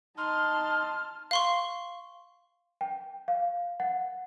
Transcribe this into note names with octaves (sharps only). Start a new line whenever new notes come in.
D#4 A5 C6 F6
F5 C6 C#6
G5
F5
F#5